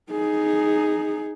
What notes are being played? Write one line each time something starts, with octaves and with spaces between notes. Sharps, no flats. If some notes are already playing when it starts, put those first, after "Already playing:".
D#4 G#4